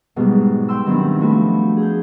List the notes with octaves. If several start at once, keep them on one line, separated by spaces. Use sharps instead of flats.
G#2 B2 F#3 G3
G5 C6 E6
D#3 F#3 B3 C4 D4 E4
F3 A3 F#4 B4
G#4 G6